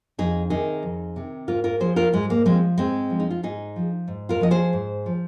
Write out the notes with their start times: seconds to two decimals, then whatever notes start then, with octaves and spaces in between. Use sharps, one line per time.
0.18 F2 D#4 G#4
0.50 C3 D#3 D#4 G#4
0.83 F2
1.16 C3 D#3
1.47 G#2 F4 A#4
1.64 F4 A#4
1.80 F3 G#4 C5
1.96 F4 A#4
2.13 G#2 G#3
2.30 A#3
2.45 F3 G#3 C4
2.78 G#2 G#3 C4
3.10 F3
3.20 D#4
3.30 F4
3.43 G#2 D#4 G#4
3.76 F3
4.08 G#2
4.29 F4 A#4
4.41 F3 D#5
4.51 G#4 C5
4.73 G#2
5.06 F3